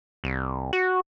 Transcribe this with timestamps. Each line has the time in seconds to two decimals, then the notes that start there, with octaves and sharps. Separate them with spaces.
0.24 C2
0.73 F#4